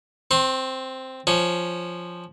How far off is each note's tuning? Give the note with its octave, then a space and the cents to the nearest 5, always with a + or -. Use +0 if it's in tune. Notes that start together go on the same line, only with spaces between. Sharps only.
C4 +0 C6 +35
F3 +0 C#4 +0